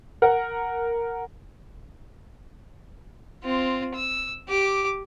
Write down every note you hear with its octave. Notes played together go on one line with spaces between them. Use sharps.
A#4 F#5
C4 F4
E6
G4 D6